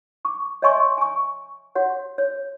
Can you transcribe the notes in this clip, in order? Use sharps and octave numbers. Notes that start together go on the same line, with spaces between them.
C#6 D6
C#5 D#5 E5 G#5 C6 C#6
G#5 C#6
F#4 C#5 F#5
C#5